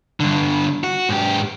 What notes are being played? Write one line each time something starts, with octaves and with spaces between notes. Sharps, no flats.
G2 D3
F#4
G#2 G4